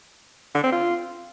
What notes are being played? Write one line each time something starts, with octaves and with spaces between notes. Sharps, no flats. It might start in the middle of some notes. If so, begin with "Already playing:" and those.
D3
C4
F4